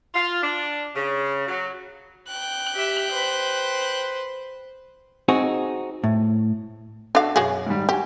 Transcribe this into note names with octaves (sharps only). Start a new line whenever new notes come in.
F4
D4
C#3
F#3
G5 F#6
G4 E5
B4 C5
C4 D#4 F#4 G#4
A2
D4 F#4 A4 E5 F5
F#2 B2 F#4 G#4
G#2 D#3 G3
F#4 G4 G#5